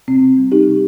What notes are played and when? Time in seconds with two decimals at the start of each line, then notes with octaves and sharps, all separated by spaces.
0.08 C3 C4
0.23 C3
0.37 G3
0.51 C3 D#4 G4
0.67 C3